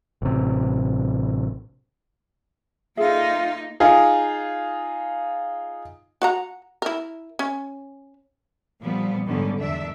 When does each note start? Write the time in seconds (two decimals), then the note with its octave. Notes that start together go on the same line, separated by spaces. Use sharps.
0.22 A1 C3
2.97 A#3 D#4 F4 G#4 A4 E5
3.80 D#4 F4 G#4
6.22 F#4 F#5 A#5
6.82 E4 A#4
7.39 C#4
8.81 A#2 F3 G3 B3
9.26 G#2 D3 D#3 G3 B3 C#4
9.59 E2 D#3 D4 E5